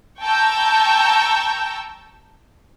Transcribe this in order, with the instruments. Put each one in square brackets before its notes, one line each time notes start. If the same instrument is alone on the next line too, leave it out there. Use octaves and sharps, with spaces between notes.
[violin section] G5 A5 A#5 C#6 E6 G6